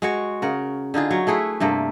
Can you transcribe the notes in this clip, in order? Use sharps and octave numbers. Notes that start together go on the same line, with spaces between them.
G#3 F#4 C#5
C#3 A#4 F#5
D3 D#4 F4 G#4
F#3 C#5
A3 E4 G#4 B4
G2 C3 A3 A#3